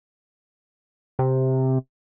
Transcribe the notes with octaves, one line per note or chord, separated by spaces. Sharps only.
C3